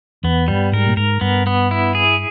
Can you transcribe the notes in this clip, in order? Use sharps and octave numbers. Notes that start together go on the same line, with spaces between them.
E2 B3
G2 G3
G#2 A#4
A#2
G#2 A#4
G2 B3
B3
E4
G#4